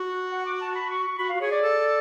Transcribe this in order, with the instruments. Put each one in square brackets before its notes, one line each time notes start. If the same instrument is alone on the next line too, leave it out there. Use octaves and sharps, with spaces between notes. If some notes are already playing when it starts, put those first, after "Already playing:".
Already playing: [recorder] F#4
[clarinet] F#5
D6
A5
B5
C#6
C#6
[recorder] F#4 [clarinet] B5
[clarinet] F5
[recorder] F#4
[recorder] G#4 [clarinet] C#5
[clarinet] D5
[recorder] A4